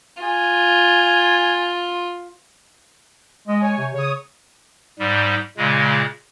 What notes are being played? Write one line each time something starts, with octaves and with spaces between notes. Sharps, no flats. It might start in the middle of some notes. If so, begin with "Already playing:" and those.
F4 G#5
G#3 D#5
C#5 G#5
C3
C#3 C#5 D#6
G#2 G3
A#2 C#3 G#3